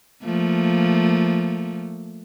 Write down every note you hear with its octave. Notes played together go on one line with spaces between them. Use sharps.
F3 A3 A#3